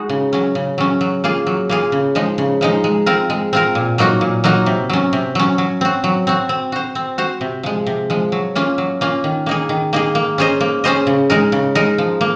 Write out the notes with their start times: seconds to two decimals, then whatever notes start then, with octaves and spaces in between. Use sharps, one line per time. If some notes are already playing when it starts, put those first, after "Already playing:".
Already playing: G#3 D#4 F#4
0.09 C#3
0.33 F#3 C#4
0.55 C#3
0.78 F#3 C#4
1.01 F#3
1.24 A#3 F4 G#4
1.47 F#3
1.69 A#3 F4 G#4
1.92 C#3
2.15 F3 G#3 D#4
2.38 C#3
2.61 F3 G#3 D#4
2.84 G#3
3.06 C4 F4 A#4
3.30 G#3
3.53 C4 F4 A#4
3.75 A#2
3.98 F#3 A#3 D#4 F#4
4.21 A#2
4.44 F#3 A#3 D#4 F#4
4.66 C3
4.89 F#3 C#4
5.13 C3
5.35 F#3 C#4
5.58 F#3
5.81 C4 F#4
6.04 F#3
6.27 C4 F#4
6.49 C4
6.72 F#4 C5
6.95 C4
7.18 F#4 C5
7.41 C3
7.63 F3 G#3
7.86 C3
8.10 F3 G#3
8.32 F#3
8.55 A#3 C#4 F4
8.78 F#3
9.01 A#3 C#4 F4
9.24 D#3
9.46 A#3 D#4 G#4
9.69 D#3
9.93 A#3 D#4 G#4
10.15 A#3
10.38 C#4 G#4 C5 D#5
10.60 A#3
10.84 C#4 G#4 C5 D#5
11.07 C#3
11.30 G#3 D#4 A#4
11.52 C#3
11.75 G#3 D#4 A#4
11.98 F3
12.21 A#3